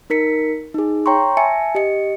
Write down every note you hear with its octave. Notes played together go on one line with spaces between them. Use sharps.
D#4 A#4 B6 C#7
D#4 G#4
C#5 G5 A#5 C6 C#6
E5 G#5 A5 C#7
G4 D#5 C#7